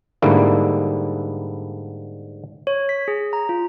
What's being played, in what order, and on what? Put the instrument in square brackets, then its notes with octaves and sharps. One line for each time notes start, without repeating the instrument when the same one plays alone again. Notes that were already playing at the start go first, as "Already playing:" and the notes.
[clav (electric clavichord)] G#2 D3 G3 A#3 E4
[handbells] C#5
B6
G#4
A#5
F4